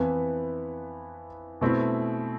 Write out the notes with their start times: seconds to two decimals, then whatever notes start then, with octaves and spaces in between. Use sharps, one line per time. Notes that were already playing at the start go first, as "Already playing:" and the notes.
Already playing: F2 E3 B3 E4 B4
1.61 B2 A3 C4 E4